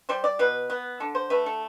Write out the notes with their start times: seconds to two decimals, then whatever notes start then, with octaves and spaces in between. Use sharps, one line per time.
0.09 G3 C5
0.24 D5
0.39 B2 B4
0.70 B3
1.00 D3 A4
1.15 C5
1.30 A3 B4
1.46 A4